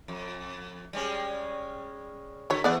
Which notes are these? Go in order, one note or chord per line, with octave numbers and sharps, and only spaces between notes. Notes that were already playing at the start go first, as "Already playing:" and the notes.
F2
G3 G#3 C#4
D3 F#3 C#5
E3 A3 B3 G#4 D5 F#5